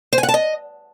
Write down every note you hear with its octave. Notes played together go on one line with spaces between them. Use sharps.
C5
G#5
F#5
A5
D#5